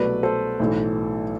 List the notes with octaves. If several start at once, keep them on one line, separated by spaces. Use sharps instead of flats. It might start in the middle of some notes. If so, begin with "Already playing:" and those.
Already playing: C2 B2 F#3 A3 B4 D5
A4 C5
B1 A2 E3 A3